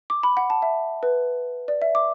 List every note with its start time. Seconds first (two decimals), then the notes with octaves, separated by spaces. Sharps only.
0.10 D6
0.23 B5
0.37 F#5
0.50 A5
0.62 E5
1.03 B4
1.68 D5
1.82 E5
1.95 D6